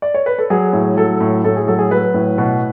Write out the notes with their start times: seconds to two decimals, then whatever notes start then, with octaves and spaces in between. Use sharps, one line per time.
0.02 D5
0.14 C#5
0.26 B4
0.38 A4
0.50 F#3 G#4
0.73 A2
0.97 F#3 A4
1.20 A2
1.44 A2 A4
1.56 G#4
1.68 F#3 A4
1.79 G#4
1.91 F#3 B4
2.14 A2
2.38 B2